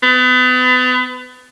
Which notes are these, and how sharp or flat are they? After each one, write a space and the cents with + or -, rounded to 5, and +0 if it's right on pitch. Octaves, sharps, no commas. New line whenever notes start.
B3 +35